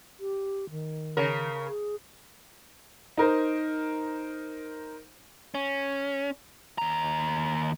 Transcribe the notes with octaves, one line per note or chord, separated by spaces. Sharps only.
G4
D#3
C#3 A#4
G#4
D#4 A#4 C5
C#4
D#2 A#5